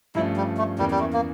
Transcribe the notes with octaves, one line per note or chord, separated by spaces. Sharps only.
G2 F3 A3 C#4 E4
G3
A3
E2 E3 G3 A#3 C#4
G3
A3
A#3